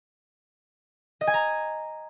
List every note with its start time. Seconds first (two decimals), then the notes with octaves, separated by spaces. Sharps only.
1.21 D#5
1.27 G#5
1.34 A#5